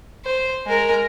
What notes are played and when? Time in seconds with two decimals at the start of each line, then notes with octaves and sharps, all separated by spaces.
0.25 C5
0.66 G#3 A#4